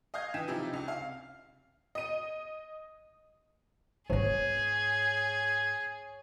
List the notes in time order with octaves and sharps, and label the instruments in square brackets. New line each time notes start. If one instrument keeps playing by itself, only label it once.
[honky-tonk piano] D#5 F5 D#6 G6 G#6
E3 G5 G#5 B6 E7
C3 F3 D#4 E4 G4
C#2 C3
F5
D#5 D#7
[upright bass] G#2 B3 [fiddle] G#4 [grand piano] C#5 [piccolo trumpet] G#6